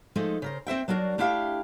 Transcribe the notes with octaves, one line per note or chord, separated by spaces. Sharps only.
F3 G#3 A3 D#4
C#3 A#4 C5
C4 C5 E5 G5
F#3 D4 F#4 A#4 D5
A3 D4 E4 G4 F5 G5